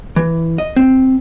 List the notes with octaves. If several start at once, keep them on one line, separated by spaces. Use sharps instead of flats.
E3
D#5
C4